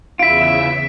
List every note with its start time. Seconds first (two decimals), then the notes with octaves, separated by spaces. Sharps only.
0.19 E2 C#3 E4 F4 E5 B6 D7